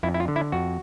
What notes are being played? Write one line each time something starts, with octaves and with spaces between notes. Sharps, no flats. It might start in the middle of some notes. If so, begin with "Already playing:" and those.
F2 E4
E4
F4
D3
E4
F2 F#4